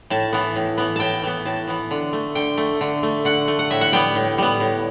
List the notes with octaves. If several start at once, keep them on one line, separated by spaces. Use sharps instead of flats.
A2 A5
E3 B3
A2
E3 B3
A2 G5 A5
E3 B3
A2 A5
E3 B3
D3
A3
D3 G5
A3
D3
A3
D3 F#5
A3
F#5
A2 E5
F#5
G3 B3 G5
A2
G3 B3
A2